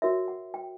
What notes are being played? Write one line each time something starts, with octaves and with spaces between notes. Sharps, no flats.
F#4 A#4 C#5 E5
F#5
G5